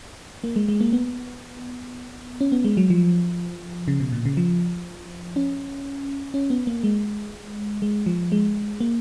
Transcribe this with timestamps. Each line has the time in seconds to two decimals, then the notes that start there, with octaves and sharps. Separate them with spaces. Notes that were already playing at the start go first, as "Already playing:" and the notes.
0.44 A#3
0.56 G#3
0.68 G#3
0.81 A#3
0.93 B3
2.41 C#4
2.52 B3
2.64 G#3
2.77 F#3
2.90 F3
3.88 C#3
4.00 B2
4.12 A#2
4.26 C#3
4.37 F3
5.36 C#4
6.34 C#4
6.50 B3
6.67 A#3
6.84 G#3
7.82 G#3
8.06 F3
8.32 G#3
8.80 A#3